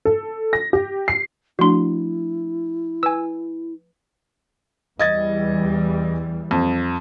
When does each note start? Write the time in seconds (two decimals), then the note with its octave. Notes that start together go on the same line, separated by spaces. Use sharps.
0.05 A4
0.53 A#6
0.73 G4
1.08 C7
1.59 F3 A3 D4 E4 F#4 C6
3.03 B4 G#5 E6
4.99 E2 E3 G3 D#5 G#6 A6
6.51 F2